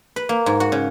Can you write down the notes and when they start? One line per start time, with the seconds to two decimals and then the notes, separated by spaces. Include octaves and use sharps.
0.16 B4
0.29 A#3
0.46 G#2
0.60 F#4
0.72 C#3